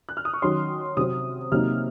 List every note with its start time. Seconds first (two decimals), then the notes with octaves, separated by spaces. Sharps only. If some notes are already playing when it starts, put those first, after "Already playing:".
0.09 F#6
0.17 F6
0.25 D#6
0.34 C#6
0.42 D#3 F#3 C#4 C6
0.97 C3 F#3 C4 D#6
1.52 C3 F#3 A#3 D#4 F6